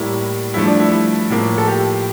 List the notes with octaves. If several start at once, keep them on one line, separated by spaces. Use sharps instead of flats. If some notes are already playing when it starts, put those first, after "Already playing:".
Already playing: A2 G3 A#3 E4
G2 F3 A3 E4
D4
E4
E4
A2 F3 A#3
A4
G4